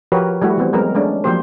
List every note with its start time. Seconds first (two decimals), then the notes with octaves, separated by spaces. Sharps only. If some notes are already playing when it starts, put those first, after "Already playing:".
0.12 F3 F#4 G4 A#4 B4 C#5
0.42 G3 A3 E4 F#4 G4
0.57 E3 B3 C4
0.73 F#3 G#3 B3 C4 A#4
0.95 G#3 A3 C#4 D4
1.24 F3 F#3 A#3 G4 C5